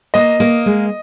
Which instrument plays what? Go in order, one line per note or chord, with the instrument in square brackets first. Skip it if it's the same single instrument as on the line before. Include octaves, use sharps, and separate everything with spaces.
[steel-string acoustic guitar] A#3 [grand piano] D#5
[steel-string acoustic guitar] A#3
G#3